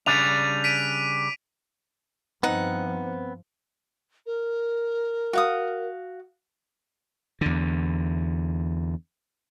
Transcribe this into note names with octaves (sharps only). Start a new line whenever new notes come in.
C#3 G3 D4 D#7 F7
B6 D7 D#7
G2 F3 B3 C4 D#4 F#5
A#4
F#4 F5 D#6
E2 D3